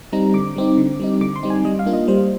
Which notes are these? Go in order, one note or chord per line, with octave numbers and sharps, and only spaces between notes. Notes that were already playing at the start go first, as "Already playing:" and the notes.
G3 C4 D#4 A#5
D3 D6
G3 C4 D#4
D3
G3 C4 D#4
D3 D6
C6
G3 C4 D#4
G#5
G3 D#5
F5
A#3 D4 F4
D#5
G3 C5